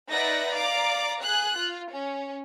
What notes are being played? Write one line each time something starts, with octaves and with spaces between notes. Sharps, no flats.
D#4 B4 D5 E5 F#5 A#6
D5 F5 A#5 D6
G#4 F#6
F4
C#4